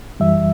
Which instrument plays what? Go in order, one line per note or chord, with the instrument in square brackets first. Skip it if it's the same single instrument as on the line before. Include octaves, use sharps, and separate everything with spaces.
[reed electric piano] F#2 E3 G3 E5